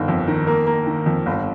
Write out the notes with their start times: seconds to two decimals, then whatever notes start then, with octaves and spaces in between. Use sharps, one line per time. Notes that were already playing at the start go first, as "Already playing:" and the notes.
Already playing: G1 D#3
0.08 F2
0.27 D#3
0.47 A#3
0.67 A#3
0.86 D#3
1.06 F2
1.26 G1